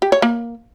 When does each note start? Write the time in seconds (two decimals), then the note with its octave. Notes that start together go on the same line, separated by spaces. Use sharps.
0.02 G4
0.12 C#5
0.22 A#3